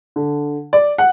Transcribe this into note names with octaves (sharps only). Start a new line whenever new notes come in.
D3
D5
F#5